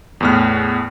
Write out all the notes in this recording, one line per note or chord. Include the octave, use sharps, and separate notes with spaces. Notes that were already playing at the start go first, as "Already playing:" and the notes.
E2 A2 F6